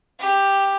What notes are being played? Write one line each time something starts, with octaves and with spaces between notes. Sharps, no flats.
G4